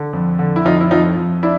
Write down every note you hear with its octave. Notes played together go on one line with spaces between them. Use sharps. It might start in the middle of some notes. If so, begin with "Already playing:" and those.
Already playing: D3
F2
D3
E4
F2 D#4 F4
E4
F2 D#4 F4
F2
D4 E4